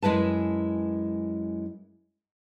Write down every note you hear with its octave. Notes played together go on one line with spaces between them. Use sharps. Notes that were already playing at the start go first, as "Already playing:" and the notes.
F#2 G#3 E4 B4 A5